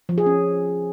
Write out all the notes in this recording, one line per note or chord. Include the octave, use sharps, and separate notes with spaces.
F3
G#4
C#4